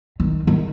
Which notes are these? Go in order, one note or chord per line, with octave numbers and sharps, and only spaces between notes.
D#3
D#3